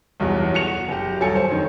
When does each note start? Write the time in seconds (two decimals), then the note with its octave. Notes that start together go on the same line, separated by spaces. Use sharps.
0.20 B1 E2 G2 B2 F#3
0.54 F#4 C#7 F7
0.88 F#1 G4
1.20 D#1 G2 F#3 A4 G#5 C#7
1.35 C5
1.51 F1 D#3 C#4